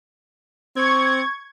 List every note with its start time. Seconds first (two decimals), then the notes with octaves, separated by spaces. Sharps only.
0.76 C4 C#6 G#6